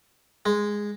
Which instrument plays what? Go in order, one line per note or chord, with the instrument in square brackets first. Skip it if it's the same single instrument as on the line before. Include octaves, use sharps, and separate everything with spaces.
[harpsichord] G#3